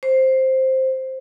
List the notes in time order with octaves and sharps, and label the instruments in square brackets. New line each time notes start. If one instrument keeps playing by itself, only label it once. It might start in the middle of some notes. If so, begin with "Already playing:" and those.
[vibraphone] C5